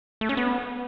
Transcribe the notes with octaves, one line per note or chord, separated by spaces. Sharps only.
A3
C#4
B3